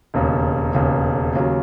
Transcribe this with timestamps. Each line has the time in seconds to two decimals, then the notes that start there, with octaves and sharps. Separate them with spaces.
0.14 E1 D#2 C#3
0.75 E1 D#2 C#3
1.35 D#2 C#3 F#3